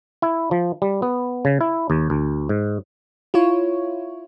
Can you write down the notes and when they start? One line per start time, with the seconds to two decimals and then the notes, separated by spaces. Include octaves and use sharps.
0.22 E4
0.51 F3
0.82 G3
1.02 B3
1.45 C#3
1.61 E4
1.90 D#2
2.10 D2
2.49 G#2
3.34 E4 F4 C#5